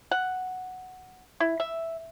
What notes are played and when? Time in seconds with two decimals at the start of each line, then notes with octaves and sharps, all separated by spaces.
0.11 F#5
1.40 E4
1.60 E5